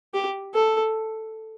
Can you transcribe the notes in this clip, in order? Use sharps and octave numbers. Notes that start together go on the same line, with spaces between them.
G4
A4